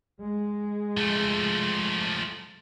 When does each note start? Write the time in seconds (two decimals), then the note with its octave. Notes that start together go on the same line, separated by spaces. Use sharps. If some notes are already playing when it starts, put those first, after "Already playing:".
0.21 G#3
0.97 F3 A3